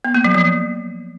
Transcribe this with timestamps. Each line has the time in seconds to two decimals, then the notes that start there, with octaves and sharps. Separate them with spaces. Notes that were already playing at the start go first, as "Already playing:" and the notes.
0.05 B3
0.14 A#3
0.24 F#3
0.34 F3